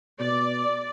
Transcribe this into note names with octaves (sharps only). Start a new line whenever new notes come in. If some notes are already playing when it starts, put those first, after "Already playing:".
B2 D5